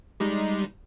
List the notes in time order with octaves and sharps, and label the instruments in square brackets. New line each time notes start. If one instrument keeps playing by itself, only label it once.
[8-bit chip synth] G3 G#3 D#4